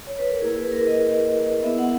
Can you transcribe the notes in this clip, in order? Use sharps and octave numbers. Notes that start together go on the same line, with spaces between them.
C#5
B4
A#4
A#3 E4 G#4
B4
A#4
D#5
B3 E4 E5
F#5